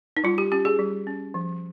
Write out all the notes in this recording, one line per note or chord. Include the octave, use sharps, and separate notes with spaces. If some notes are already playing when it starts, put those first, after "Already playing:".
D#4
G3 F4
G4
C#4 G4
G#4
G3
C#4
F3